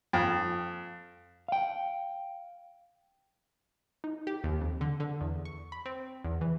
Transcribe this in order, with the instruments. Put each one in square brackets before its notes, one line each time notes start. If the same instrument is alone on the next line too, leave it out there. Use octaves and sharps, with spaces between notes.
[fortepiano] F2
[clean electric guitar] F5 G5
[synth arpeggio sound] D#4
G4
D#2
F2
D3
D3
E2
C#6
B5
C4
E2
E3